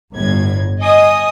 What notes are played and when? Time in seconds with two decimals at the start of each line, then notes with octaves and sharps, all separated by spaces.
0.13 G1 A2 G#6
0.81 D#5 G#5 D#6